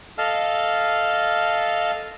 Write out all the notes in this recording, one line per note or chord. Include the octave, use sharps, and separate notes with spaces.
A4 D#5 F5 A5 F6